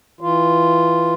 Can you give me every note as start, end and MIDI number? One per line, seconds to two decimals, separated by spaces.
0.21 1.14 52
0.21 1.14 65